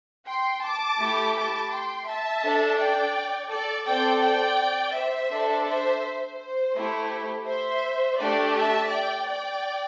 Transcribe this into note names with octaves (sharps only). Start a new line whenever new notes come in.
G5 C6
A5 D6
A3 E4 G4
A5 D6
G5 C6
E5 A5
D4 A4
D5 G5
A4 D5
C4 A4 D5 G5
D5 G5
C5 E5
D4 A4
C5 E5
C5
C5
A3 E4 G4
C5 E5
A3 D4 G4 D5 G5
E5 A5
D5 G5
D5 G5